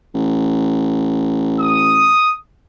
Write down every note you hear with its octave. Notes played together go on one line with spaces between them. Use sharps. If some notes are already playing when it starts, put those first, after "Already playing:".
A1
D#6